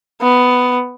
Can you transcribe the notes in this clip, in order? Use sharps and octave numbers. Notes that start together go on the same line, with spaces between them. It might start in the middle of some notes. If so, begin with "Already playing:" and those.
B3